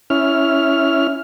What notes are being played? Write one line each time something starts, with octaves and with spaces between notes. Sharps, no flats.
C#4 E4 F6